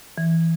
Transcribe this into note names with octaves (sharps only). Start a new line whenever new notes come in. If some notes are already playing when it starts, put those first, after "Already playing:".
E3